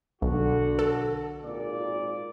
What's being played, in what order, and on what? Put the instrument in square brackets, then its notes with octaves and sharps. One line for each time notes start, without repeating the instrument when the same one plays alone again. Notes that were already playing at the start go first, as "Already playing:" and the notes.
[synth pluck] B1 [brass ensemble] D3 F#4
[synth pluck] A4
[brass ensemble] G#1 A#2 D5